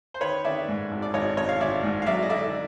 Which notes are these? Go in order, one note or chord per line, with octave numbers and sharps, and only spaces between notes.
C5
D#3 B4 C#5
D#3 D5 E5
G#2
G#1
D5
G#1 C#5 D#5
G#1 C#5 D#5
F5
G#1 D5 E5
G#2
F5
F#3 D5 E5
D#5
D3 D5 E5